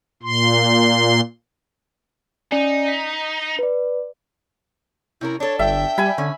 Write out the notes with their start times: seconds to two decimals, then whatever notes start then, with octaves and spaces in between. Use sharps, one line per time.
0.23 A#2 C6
2.52 C#4 D#4 D5 G#5
2.88 B6
3.59 B4 D5
5.21 C3 C#4 E4 A#4
5.40 D4 A4 C#5
5.59 G1 E5 G5
5.98 G3 G#5 B5
6.18 D3 C#4